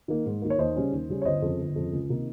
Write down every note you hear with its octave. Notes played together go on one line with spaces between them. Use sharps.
D#3 A#3
G#2
D#3 A#3
C#5
D#2 C5 D#5
C#3 G3 C#4
D#2
C#3 G3 C#4
C#5
G1 C5 D#5
F2 C#3
G1
F2 C#3
C#2
C3 D#3 A#3 D#4